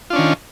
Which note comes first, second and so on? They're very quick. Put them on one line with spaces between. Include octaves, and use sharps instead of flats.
F4 D4 C#4 D#3